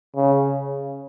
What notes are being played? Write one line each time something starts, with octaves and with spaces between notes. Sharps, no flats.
C#3